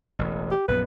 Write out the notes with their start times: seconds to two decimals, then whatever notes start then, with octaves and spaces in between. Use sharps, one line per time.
0.19 E1 A1
0.51 G4
0.68 A#1 F#2 B3 B4